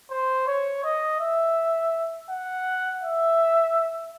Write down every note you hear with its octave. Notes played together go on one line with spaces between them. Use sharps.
C5
C#5
D#5
E5
F#5
E5